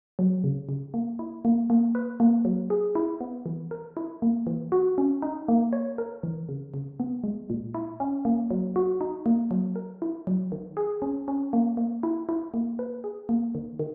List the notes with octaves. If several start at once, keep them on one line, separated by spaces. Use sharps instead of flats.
F#3
C#3
C#3
A#3
E4
A#3
A#3
B4
A#3
F#3
G#4
E4
B3
E3
A#4
E4
A#3
E3
F#4
C#4
D#4
A#3
C#5
A#4
E3
C#3
C#3
B3
G#3
A#2
E4
C#4
A#3
F#3
F#4
D#4
A#3
F#3
A#4
E4
F#3
D#3
G#4
C#4
C#4
A#3
A#3
E4
E4
A#3
B4
G#4
A#3
D#3
D#3